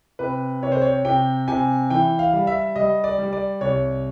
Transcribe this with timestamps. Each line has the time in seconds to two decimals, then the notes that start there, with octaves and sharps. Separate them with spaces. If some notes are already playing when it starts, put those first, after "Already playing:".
0.19 C3 B4
0.62 C3 C#5
0.72 C5
0.82 C#5
1.05 C3 G5
1.48 C3 G#5
1.90 E3 G5
2.19 F5
2.33 G3
2.47 E5
2.76 G3 D#5
3.04 D5
3.19 G3
3.33 D5
3.61 C2 C#5